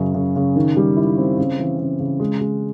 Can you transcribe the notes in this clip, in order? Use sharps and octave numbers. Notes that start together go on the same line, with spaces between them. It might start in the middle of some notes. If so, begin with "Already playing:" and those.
Already playing: F#2 C#3
C#3
C#3
D#3
G3
E4
C4
C#3
E3
C#3
C#3
G#3
G#3